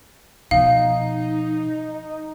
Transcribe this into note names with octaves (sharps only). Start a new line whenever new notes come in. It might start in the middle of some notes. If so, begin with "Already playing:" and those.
B2 F3 D#4 F5